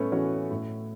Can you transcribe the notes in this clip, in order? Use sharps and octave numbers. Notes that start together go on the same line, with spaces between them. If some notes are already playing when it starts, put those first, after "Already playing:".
Already playing: A2 A3 B3 C#4
E3 C#4 F#4
A2